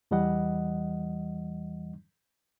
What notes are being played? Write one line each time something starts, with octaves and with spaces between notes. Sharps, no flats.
E2 E3 G3 D#5 F#5